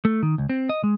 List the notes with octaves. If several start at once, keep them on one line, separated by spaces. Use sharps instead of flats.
A3
D#3
C#2
C4
D#5
G#3